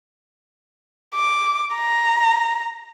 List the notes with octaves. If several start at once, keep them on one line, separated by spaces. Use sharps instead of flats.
D6
A#5